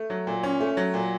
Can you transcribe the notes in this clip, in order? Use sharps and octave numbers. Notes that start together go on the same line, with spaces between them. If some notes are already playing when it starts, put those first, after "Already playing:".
Already playing: A3
F#3
A#2
C#4
A3
F#3
A#2